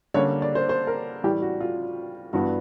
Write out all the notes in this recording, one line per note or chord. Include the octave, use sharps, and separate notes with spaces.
D3 G3 A#3 C#4 C#5
D5
C5
C5
A#4
A2 E3 G3 G4
F#4
F4
G2 E3 G3 B3 F#4